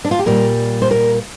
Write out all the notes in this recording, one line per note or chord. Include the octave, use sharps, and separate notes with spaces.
D4
F4
G4
A#2 G3 A#4
C5
A#4